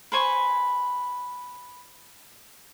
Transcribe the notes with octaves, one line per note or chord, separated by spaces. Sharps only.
B4 C5 G#5 C#6